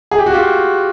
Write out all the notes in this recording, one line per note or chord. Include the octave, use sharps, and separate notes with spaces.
G#4
G4
F#4
F4 G4